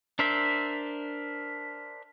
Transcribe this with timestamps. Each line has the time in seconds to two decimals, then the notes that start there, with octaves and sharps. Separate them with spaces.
0.19 D4 A#4 C5 E5